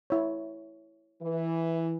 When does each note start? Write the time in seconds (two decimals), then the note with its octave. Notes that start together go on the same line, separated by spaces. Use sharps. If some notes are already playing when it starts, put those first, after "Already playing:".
0.10 E4 C#5
1.22 E3